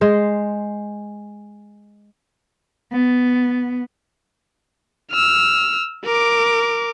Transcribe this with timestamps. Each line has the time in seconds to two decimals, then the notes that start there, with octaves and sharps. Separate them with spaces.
0.01 G#3 C5
2.92 B3
5.12 E6 F6
6.05 A#4 D6